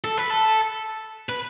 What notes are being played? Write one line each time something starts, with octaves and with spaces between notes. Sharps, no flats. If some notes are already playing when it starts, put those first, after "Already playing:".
A4
B4
A4
B4